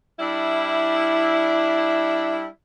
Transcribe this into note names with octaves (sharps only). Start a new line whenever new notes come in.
G3 D4 E4